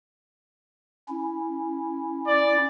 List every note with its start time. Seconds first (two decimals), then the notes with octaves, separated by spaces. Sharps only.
1.09 C#4 E4
2.27 D5